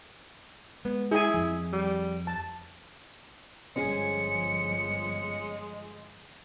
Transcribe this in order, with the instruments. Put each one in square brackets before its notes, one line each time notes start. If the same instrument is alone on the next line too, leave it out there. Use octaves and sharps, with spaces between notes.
[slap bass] G#3 [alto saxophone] B3
[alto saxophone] E4 [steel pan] G#4 G#5
[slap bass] F2 F3
[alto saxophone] G3
[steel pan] A5
[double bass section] G1 F3 [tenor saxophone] G#3 [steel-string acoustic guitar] C#4 G#4 [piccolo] C#7